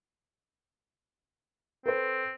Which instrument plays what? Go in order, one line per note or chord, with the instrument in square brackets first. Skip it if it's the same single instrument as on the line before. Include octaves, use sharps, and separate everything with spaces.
[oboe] C4 [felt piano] A4 B4 C5